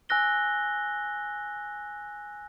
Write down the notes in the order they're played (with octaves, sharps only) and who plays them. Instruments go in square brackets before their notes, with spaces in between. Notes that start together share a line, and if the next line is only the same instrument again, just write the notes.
[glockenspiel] G#5 E6 F#6 A#6 G7